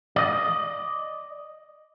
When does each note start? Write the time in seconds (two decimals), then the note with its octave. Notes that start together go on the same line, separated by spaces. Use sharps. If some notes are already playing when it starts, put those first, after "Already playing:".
0.16 D5 D#5